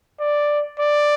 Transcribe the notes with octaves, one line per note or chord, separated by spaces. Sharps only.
D5
D5